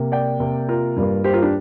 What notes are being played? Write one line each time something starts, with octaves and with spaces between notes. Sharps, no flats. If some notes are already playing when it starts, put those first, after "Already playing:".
Already playing: C3 A#3
D5 G5
C3 A#3
F4 A#4
G2 G3 A#3
G4 C5
F4 A#4
D4 G4